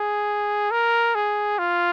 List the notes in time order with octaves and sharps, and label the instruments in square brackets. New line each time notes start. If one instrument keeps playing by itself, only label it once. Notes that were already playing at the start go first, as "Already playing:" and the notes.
Already playing: [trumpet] G#4
A#4
G#4
F4